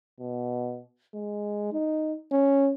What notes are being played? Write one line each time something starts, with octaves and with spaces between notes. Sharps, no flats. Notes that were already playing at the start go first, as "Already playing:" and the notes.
B2
G#3
D#4
C#4